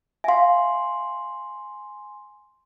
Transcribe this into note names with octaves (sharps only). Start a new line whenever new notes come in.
E5 F5 G#5 C6